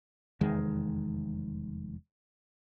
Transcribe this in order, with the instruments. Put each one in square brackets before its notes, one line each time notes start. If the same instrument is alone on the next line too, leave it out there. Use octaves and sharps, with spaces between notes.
[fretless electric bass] F1 E2 D#3 G#3